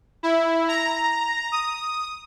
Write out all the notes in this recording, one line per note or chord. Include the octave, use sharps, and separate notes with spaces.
E4
A#5
D#6